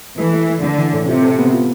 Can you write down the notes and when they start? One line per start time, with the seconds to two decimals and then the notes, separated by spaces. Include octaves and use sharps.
0.18 E3 A3
0.33 A3
0.49 A3
0.63 D3 A3
0.78 E3
0.93 A2
1.08 C3 F4
1.23 A4
1.39 B3
1.54 F4